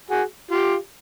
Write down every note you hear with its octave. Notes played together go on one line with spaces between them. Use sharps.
F#4 G#4
F4 G4